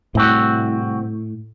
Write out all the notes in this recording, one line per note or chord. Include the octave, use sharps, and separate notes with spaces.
C2 A2 C4 F#4